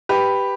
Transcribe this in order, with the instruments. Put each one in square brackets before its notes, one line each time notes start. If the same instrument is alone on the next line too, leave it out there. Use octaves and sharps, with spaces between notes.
[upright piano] G4 B4